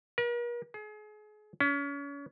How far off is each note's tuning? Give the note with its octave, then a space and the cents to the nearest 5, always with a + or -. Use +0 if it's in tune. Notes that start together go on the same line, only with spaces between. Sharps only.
A#4 +45
G#4 +35
C#4 +35